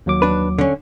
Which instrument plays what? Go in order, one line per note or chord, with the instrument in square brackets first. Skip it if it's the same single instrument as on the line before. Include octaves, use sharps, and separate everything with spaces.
[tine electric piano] D#2 F#3 D6
[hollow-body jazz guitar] D4 B4
D3 C#4